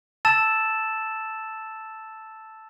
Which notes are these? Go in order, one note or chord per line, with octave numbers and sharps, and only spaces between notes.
A5 E6 A6 E7